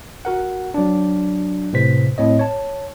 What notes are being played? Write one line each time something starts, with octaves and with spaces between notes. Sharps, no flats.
F#4 A#4 F#5
F#3 D4
A2 C3 B4 C5 B6
A2 C4 C#5 D#5
C#5 A5